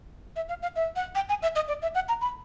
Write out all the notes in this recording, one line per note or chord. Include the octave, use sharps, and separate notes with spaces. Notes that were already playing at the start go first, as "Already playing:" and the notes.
E5
F5
F5
E5
F#5
G5
G#5
E5
D#5
D5
E5
F#5
A#5
B5